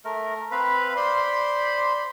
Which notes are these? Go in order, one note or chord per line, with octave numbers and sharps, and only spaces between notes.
A3 A#4
C4 B4 F5 B5
C5 D5 B5 C6